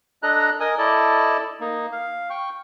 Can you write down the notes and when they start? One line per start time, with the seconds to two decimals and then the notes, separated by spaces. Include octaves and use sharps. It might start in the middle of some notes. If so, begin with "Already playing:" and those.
0.23 D4 A4 D#5 A#5 F#6
0.60 A#4 D#5 G#5 D#6
0.78 E4 A4 D5 D#5 A5
1.60 A#3 D#4
1.92 F5
2.30 G5 C#6